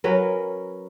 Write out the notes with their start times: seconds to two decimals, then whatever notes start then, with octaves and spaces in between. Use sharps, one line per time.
0.04 F#3 C#4 A#4 B4